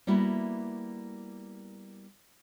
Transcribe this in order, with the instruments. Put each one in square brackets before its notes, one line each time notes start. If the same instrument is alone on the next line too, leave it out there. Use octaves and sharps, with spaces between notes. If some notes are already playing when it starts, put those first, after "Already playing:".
[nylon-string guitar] G3 A#3 B3 E4 F#4